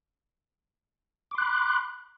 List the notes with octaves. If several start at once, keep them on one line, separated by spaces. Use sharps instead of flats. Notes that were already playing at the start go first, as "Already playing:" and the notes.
B5 C6 D6 F#6